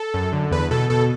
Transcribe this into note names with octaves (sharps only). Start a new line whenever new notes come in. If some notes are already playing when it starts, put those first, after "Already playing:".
Already playing: A4
F#2
D3
E2 B4
B2 A4
B2 A4